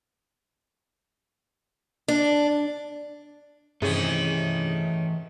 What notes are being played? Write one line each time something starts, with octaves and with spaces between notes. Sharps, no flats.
D4
G2 C3 D#3 E3 A3 C#4 G#4